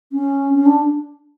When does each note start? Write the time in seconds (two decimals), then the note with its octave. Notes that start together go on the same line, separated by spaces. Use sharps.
0.12 C#4
0.56 C#4
0.66 D4